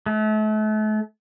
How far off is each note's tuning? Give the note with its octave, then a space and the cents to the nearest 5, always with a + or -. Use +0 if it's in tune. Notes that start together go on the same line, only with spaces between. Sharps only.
A3 -35